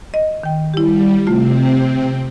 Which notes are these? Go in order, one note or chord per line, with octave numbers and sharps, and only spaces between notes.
D#5
D#3 G5
G3 E4 G4
C3 A3 C4 F4